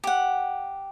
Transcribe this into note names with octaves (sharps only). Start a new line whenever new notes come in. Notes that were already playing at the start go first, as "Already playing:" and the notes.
G4 F#5